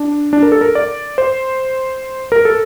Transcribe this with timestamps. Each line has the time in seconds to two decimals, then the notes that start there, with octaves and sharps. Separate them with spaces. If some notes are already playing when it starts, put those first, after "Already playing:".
Already playing: D4
0.33 D4
0.42 A#4
0.52 A4
0.61 A#4
0.75 D5
1.18 C5
2.32 A#4
2.45 A4